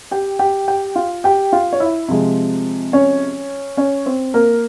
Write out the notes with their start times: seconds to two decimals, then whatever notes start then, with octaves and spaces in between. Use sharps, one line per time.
0.11 G4 G5
0.39 G4 G5
0.68 G4 G5
0.96 F4 F5
1.24 G4 G5
1.53 F4 F5
1.73 C#5
1.80 E4 E5
2.08 C3 F3 G#3
2.93 C#4 C#5
3.77 C#4 C#5
4.06 C4 C5
4.34 A#3 A#4